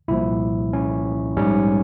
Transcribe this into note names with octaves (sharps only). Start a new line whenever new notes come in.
C2 A#2 F3 E4
C#4
A#1 G#2 G3 C#4